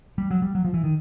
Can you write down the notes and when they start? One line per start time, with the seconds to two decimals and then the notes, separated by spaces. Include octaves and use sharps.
0.18 G3
0.31 F#3
0.42 G3
0.55 F#3
0.65 F3
0.74 E3
0.84 D#3